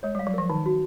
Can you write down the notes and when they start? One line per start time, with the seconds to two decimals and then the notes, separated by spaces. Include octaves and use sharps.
0.03 G#3 C#5
0.15 G3 F5
0.27 F#3
0.34 F3 A#4
0.50 D#3 D#4
0.66 F#4